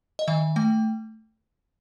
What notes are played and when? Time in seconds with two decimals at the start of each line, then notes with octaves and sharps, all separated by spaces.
0.19 D#5
0.28 D#3 E5
0.56 A3 G5